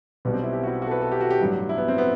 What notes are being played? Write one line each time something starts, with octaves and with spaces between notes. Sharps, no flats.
B1 B2 G3 B3
C4
E4
G4
F#4
E4
F#4
A4
B4
A4
G4
F#4
G4
A1 G2 F#3
E4
B3
C4
B3